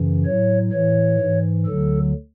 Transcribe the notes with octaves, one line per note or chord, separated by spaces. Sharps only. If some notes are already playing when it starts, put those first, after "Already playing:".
Already playing: F#2 C#3 E3
A2 F#3 C#5
A2 E3 C#5
G#2 E3
D2 D3 F#3 A4